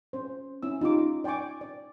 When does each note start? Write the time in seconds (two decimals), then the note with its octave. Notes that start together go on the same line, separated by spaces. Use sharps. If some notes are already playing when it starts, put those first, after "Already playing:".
0.13 C#4 C5
0.63 C#4 E4 E6
0.81 D#4 F4 G4 D6
1.24 D5 G5 G#5 C#6 D6
1.61 D5